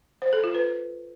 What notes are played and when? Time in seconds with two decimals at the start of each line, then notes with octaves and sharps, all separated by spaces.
0.22 C5
0.33 A4
0.44 F4
0.55 B4